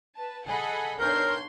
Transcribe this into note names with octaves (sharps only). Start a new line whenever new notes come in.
B4 A5
G#4 A4 D#5 F#5 G#5 B5
B1 D4 A#4 C#5 C6 G6